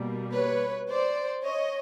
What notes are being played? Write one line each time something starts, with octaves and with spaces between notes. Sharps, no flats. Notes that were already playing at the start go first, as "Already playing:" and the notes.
Already playing: B2 G3 A#3
B4 C#5
C5 D5
C#5 D#5